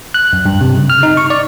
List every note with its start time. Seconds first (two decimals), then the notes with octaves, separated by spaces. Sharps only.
0.14 F#6
0.33 F#2
0.45 G2
0.61 C3
0.75 C#3
0.90 F6
1.03 D#4
1.17 C#6
1.30 D5